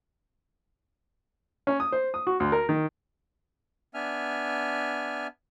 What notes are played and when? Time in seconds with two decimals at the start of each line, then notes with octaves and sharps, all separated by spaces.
1.67 C#4
1.80 D#6
1.92 C5
2.14 D#6
2.27 F#4
2.40 D2
2.52 A#4
2.69 D#3
3.94 B3 D4 E5 G#5 F6